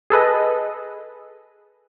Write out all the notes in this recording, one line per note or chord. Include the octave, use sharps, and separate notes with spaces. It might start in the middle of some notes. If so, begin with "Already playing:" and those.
G#4 A4 B4 D#5